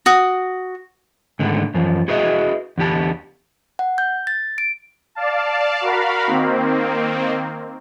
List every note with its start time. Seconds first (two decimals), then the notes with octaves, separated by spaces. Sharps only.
0.06 F#4 D#6
1.39 G#2 D3 D#3 A3
1.74 F#2 E3 F3
2.08 E4 F#4 G#4 B4 D#5 E5
2.78 E2 D3 G4 A5
3.79 F#5
3.98 G6
4.27 A6
4.58 D7
5.15 D5 F5 A5
5.81 F#4 A#4 F5 B5
6.27 D#3 A#3 C4